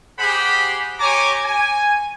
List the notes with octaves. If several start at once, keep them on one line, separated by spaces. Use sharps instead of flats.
G4 G#4 C5 F#5 B5
G4 C#5 G#5 A#5 D6
G#5